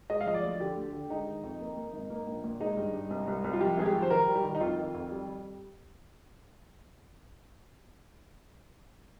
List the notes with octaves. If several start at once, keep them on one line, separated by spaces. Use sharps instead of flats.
G#3 D#5
F5
F3 D#5
D5
D2
D3 G4
D2
D3
G#3 D#4
D#3
F2
A#3
A#3
G#1
A#3
A#1
A#2
G#3 D#4
G2
G2
C2
C2
C2
F4
F3 G4
G#1 G#4
G4
F3
C5
D#3 A#4
G3
G4
D#3
D#4
F2 F4
D#3
F2
G3